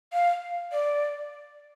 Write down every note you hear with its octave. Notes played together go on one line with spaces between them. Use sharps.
F5
D5